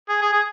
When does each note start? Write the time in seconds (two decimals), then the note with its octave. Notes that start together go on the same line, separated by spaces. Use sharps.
0.09 G#4
0.22 G#4
0.33 G#4